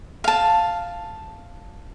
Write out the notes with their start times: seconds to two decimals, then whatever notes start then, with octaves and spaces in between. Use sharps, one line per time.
0.24 F5 A5